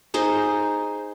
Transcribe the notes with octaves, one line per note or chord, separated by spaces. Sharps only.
D#4 G#4 C5